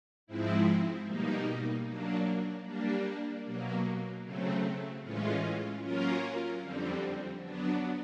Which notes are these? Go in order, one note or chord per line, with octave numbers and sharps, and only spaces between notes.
G#2 F3 G#3 C4 E4
B2 G3 A#3 D#4
F#3 A#3 D4
G3 A#3 D4
B2 F#3 A#3
C#3 F#3 A3 C4
A2 E3 G#3 C#4 F4
F#3 A#3 C#4 F4 A#4
F2 D3 G3 C4
F#3 B3 D4